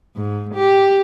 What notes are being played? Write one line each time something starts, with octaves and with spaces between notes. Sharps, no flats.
G#2
G4